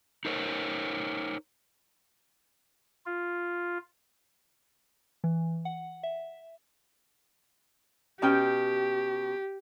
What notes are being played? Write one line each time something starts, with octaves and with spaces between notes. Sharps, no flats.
D#4 A#4 C5 C#5
F4
E3
F#5
E5
B2 C#4 G4 G5